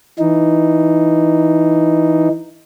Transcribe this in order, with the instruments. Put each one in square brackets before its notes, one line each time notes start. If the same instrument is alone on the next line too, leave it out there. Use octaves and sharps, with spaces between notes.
[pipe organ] E3 D#4